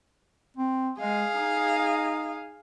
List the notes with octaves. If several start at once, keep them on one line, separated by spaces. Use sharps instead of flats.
C4
G#3 G#4 F5
D#4